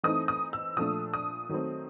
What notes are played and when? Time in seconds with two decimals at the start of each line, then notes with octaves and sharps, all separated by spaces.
0.03 E3 A3 C4 D#4 D#6
0.28 D#6
0.53 E6
0.76 A#2 F3 A3 D4 D#6
1.14 D#6
1.49 D#3 F#3 A3 C4